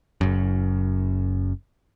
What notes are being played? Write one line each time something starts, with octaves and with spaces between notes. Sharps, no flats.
F#1 F#2